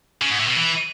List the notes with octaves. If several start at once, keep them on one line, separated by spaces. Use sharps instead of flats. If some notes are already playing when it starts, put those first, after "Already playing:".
C#3
G#2
A2
B2
E3